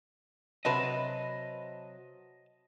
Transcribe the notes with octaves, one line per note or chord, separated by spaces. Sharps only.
C3 F#3 B4 D#5 A5